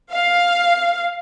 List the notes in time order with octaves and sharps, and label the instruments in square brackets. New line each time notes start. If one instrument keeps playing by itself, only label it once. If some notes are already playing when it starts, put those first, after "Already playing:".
[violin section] F5